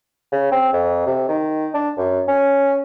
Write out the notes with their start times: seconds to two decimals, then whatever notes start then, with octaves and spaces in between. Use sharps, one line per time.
0.32 C#3
0.52 C4
0.73 F2
1.06 C3
1.29 D#3
1.74 D4
1.98 F#2
2.28 C#4